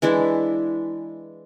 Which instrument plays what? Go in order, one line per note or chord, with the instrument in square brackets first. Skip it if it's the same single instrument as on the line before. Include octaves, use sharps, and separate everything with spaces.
[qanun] E3 G#3 D4 E4